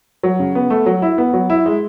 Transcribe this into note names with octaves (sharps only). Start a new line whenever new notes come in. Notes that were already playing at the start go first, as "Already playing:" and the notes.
F#3
C#3
B3
A3
F#3
E4
B3
F#3
E4
G#3